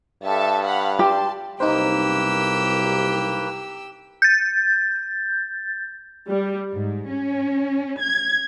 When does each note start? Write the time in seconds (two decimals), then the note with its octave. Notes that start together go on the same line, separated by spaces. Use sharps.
0.23 G2 A4 E5 A5
0.63 F5 F#5 B5
0.99 G4 A5 C6
1.60 F#1 C2 A#3 D#4 G4 B4 C5 E6
4.22 G6 A6
6.30 G3
6.72 G#2
7.10 C#4
8.02 G#6